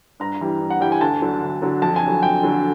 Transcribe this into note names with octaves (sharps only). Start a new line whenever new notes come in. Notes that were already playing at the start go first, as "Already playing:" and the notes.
G2 A#5
E3 G3
G2
F#5
E3 G3 G5
G#5
D2 A5
D3 F#3
D2
D3 F#3
F2 A5
G#5
D3 F#3
F2 G5
D3 F#3